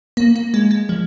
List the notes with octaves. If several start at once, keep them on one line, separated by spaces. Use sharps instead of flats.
A#3
A#3
G#3
G#3
F3